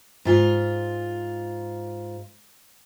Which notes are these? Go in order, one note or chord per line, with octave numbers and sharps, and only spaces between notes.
G#2 F4